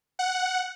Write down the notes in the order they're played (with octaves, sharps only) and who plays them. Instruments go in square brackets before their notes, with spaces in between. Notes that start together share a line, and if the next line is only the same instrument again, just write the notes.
[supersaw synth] F#5